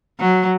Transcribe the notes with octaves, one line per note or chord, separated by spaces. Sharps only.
F#3